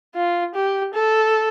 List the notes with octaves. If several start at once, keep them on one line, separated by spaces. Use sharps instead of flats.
F4
G4
A4